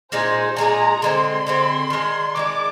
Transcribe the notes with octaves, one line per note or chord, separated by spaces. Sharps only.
A#2 G#3 D#4 G#4 C5
A#2 G#3 D#4 G#4 A#5
D3 G#3 C4 C6
D3 G#3 C4
D#3 G#3 D4
D#3 G#3 D4 D6